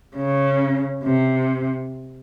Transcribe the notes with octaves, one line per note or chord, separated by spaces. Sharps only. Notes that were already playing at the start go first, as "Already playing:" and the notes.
C#3
C3